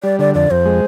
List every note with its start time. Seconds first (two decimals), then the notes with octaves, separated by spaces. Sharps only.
0.03 G3 D5
0.19 D3 D5
0.34 F2 D5
0.51 F2 C5
0.65 G#3